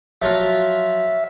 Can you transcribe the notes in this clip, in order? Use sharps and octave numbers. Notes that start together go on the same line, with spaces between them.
F3 F#3 F4 E5